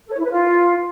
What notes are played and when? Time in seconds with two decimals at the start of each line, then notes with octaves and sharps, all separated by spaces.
0.07 A4
0.13 C#5
0.18 E4
0.24 B4
0.30 F4